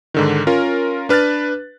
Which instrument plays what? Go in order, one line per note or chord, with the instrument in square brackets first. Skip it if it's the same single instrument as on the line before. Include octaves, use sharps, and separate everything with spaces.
[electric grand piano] G#2 D3 D#3
C#4 F4 A#4
D4 B4 F6 F#6 A6